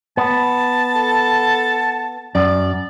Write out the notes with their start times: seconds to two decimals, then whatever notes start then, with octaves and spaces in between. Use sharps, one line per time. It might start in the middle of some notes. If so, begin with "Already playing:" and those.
0.17 B3 A5
0.95 A4
2.35 F#2 D5